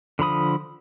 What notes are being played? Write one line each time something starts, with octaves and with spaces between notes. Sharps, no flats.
D3 F3 B5 D#6